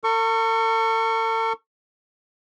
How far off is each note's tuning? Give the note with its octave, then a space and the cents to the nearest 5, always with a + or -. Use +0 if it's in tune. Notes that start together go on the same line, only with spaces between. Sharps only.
A4 +45 C#6 +0